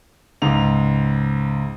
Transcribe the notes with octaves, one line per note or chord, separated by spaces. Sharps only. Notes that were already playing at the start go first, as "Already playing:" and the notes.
C#2 G#2 F7